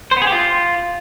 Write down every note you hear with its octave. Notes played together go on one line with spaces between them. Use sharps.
C5
B3
G#4
G4
F4